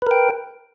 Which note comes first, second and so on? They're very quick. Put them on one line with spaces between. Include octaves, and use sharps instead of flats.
B4 A#4 G5